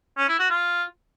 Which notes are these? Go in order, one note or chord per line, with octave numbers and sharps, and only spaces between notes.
C#4
E4
F#4
F4